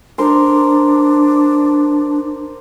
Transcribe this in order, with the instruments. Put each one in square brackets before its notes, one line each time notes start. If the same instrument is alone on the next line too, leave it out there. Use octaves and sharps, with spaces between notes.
[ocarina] D4 [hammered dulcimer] A#4 C5